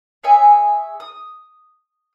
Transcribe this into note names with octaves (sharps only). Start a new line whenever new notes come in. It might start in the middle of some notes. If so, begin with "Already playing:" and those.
G#4 C#5 E5 G#5
D#6